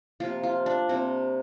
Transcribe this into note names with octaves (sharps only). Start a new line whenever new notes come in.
C3 F3 A#3 F4
F4
D4
C3 G3 A#3 C4